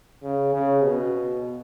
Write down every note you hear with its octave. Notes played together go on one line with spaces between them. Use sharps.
C#3
C#3
B2